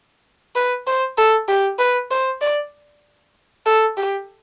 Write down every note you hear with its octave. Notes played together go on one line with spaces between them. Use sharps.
B4
C5
A4
G4
B4
C5
D5
A4
G4